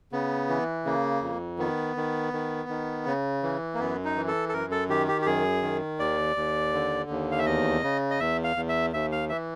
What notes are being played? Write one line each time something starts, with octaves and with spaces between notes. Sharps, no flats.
C#3 B3
E3
C#3 A#3
F2
D#3 B3
D#3
D#3
D#3
C#3
E3
A#3
F#2 B3
D#4
E3
A4
A4
F#2 A#4
A4
D#3 G4
G4
G4
F#2 G#4
D#3
D#2 D5
D#2
D3
D#2
F5
E5
E2 D#5
C#3
D#5
E2 E5
F5
E2
E5
D#2 E5
F5
E3 E5